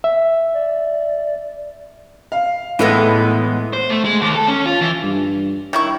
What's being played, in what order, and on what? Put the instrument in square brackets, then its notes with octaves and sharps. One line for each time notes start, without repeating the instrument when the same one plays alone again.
[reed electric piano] E5
[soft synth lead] D5
[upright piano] F5
[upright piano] A2 A4 A#6 [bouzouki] E3 G#3 B3
[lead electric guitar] C5
A3
G#3
D#2
A4
C#4
F4
E3
[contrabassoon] G2
[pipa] D#3 E4 C#6